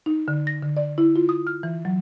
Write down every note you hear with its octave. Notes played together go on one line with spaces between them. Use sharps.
D#4
D3
A#6
D3
D5
E4
F4
D#6
F6
E3
F#3